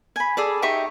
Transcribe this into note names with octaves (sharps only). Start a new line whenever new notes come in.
G#5 B5
G#4 A4 D5
D#4 G4 E5 C#6